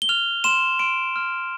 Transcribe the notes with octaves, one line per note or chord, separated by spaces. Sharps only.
G7
F6 F7
C6 E7
C6 D7
F6